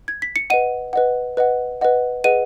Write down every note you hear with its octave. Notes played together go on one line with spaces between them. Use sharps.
G#6
B6
C#7
B4 D#5 F#5 D#7
B4 D#5 F#5
B4 D#5 F#5
B4 D#5 F#5
G#4 B4 D#5 F#5 D#7